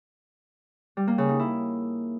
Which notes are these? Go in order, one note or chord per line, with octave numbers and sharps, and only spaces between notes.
G3
A#3
C#3
D#4
E4